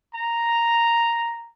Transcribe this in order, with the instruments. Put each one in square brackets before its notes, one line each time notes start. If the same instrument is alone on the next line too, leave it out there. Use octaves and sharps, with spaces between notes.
[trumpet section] A#5